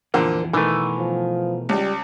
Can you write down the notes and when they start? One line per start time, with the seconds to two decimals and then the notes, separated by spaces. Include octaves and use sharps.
0.14 F2 A#2 D3 E3 A#4 C5
0.53 B2 D#3 E3 A3 A#4 B4
0.99 F3
1.69 C#2 G3